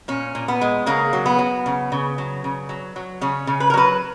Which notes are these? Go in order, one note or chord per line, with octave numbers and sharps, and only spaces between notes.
A#2 C#4
A#2
B3
G#3
C#3 A#3
F#3
B3
F#3
C#3
C#3
F#3
C#3
F#3
F#3
C#3 C#4
C#3
B4
A#4
F#3 B4